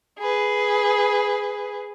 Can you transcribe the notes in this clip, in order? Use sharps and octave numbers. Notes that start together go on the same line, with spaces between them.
G#4 B4